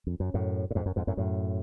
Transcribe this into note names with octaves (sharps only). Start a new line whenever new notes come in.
F2
F#2
F#2 A2
A2
F2 G#2
F#2
F2 G#2
F#2 A2
F#2 A2